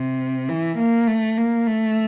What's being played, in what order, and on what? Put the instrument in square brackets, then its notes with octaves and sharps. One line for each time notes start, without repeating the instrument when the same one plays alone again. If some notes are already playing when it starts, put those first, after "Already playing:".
Already playing: [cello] C3
E3
A#3
A3
A#3
A3